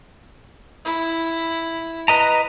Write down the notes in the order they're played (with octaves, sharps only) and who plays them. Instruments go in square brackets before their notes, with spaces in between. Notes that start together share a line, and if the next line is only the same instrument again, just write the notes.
[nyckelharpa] E4
[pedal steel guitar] B4 D#5 A#5